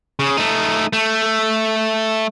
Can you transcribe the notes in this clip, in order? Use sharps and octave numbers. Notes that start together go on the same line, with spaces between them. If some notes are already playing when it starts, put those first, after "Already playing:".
C#3
A3 D#4
A3